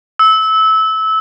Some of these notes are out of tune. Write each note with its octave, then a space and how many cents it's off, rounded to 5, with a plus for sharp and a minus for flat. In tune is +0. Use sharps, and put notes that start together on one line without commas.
E6 -20